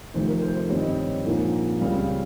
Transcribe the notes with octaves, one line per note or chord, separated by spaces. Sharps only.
F1 F2 C3 D#3 C5
A#4
C5
C5
G#1 G2 G3 C4 C#5
D#5
C#5
A#1 G#2 F3 A#3
C#2 C#3 G3 C4 F5